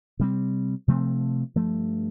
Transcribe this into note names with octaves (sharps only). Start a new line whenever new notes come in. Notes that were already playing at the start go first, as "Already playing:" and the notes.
C3 G3 C4
C3 F3 A3 C4
G2 F3 A3